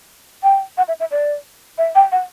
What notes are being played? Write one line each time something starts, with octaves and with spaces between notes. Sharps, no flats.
G5
F#5
E5
E5
D5
E5
G5
F#5